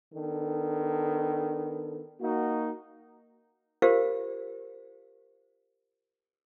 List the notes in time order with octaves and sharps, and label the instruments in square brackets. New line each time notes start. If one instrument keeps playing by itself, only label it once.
[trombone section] D#3 B3 D4 A4
A#3 D#4 F#4
[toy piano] F4 G4 A#4 C5 F5